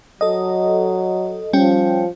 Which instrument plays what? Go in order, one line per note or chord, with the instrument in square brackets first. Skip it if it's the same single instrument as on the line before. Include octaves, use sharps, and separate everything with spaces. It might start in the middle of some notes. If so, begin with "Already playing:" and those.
[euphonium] F#3 [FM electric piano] A4 D#5
[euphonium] F3 [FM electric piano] G3 C#4 G5